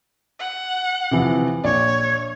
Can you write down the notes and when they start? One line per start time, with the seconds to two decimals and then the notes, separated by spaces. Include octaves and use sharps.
0.40 F#5
1.11 C3 E3 F3
1.64 A#1 C#5 D5